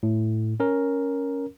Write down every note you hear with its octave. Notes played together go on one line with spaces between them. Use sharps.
A2
C#4 A#4